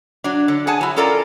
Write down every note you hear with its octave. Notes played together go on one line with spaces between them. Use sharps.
F#3 D4
D3
G#4 F#5 G#5 A5
F#3 E4
C#4 F4 A4 A#4 D5 A#5